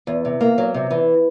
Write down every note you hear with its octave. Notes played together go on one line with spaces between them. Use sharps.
E2
C3
A#3
F#3
C3
E3